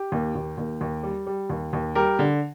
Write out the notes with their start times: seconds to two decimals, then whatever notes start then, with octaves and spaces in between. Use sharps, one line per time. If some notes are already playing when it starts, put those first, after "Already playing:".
Already playing: G4
0.12 D#2
0.35 D#2
0.58 D#2
0.81 D#2
1.03 G3
1.27 G3
1.50 D#2
1.73 D#2
1.95 G3 G4 A#4
2.19 D3